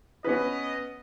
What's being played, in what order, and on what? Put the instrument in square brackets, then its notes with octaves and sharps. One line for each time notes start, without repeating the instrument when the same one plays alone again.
[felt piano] B3 C#4 B4 [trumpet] D#5